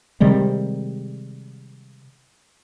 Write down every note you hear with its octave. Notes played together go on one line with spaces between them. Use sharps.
C3 D#3 G3 G#3